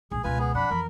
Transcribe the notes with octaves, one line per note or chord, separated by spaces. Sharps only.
A#1 G#2 G#4
C#2 B2 F4 B4 G#5
B3 G#4
F2 D4 F#5 B5
F2 E3 A#4